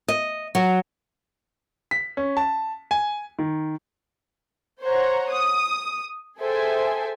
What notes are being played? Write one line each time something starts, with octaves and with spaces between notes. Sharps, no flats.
D#5
F#3
B6
C#4
A5
G#5
D#3
C5 C#5 F#5 A#5
D#6
G#4 A4 C5 E5 G5 G#5